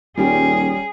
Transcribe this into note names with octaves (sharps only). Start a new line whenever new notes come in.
D#1 G3 C#4 G4 G#4